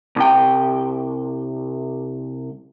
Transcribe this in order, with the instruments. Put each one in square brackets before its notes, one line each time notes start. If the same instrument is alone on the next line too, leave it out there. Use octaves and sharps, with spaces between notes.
[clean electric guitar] C2 G5